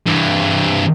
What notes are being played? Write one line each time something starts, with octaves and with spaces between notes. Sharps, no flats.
G2 E3